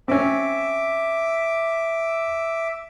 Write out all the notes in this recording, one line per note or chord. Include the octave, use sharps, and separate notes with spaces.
C4 C#4 E5 D6